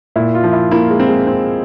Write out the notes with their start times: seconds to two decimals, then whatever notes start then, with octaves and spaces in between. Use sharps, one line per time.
0.16 A#2 E4
0.35 F4
0.44 F3
0.53 E4
0.71 A#3 E4
0.90 G#3
0.99 C4
1.08 G#3
1.27 C4